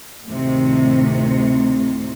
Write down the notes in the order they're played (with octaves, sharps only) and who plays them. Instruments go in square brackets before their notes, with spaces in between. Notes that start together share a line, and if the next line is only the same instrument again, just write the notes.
[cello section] D2 A2 C3 D#3